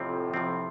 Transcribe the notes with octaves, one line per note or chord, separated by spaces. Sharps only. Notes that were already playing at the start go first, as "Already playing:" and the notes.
Already playing: F2 A2 C3 F3 C4
C3 F3 C4